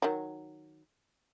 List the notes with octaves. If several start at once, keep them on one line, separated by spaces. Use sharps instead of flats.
D#3 F#3